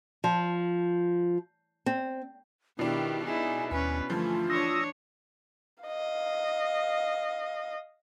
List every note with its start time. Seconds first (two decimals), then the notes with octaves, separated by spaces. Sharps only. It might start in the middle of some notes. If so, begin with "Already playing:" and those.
0.24 F3
1.86 C4
2.79 B2 D#3 D4 E4 G4
3.26 D#4 E4 G#4 G#5
3.71 D#2 C#4 B4 G#5 B5
4.10 G2 D3 E3 F3 A3 F4 G#5
4.50 D4 C#5 D#6 E6 A#6
5.84 D#5 F5